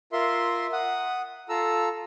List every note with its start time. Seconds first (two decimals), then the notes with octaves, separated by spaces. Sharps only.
0.13 F4 A#4 E5 C6
0.73 F#5 D#6
1.49 F4 A4 A#5 E6